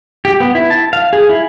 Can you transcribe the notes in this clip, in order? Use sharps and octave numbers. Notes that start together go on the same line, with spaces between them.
G4
B3
E4
A5
F5
G#4
E4